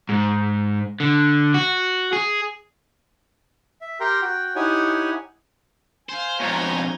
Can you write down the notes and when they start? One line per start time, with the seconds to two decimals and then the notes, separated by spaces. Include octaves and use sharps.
0.09 G#2
1.00 D3
1.54 F#4
2.13 G#4
3.81 E5
4.00 G4 A#4 G5 A#5 C6
4.22 F#4 G5
4.56 D#4 E4 G4 C#5 F#5 G#5
6.09 C5 F5 G#5
6.40 F2 G#2 B2 C#5 G#5 A#5 G6 G#6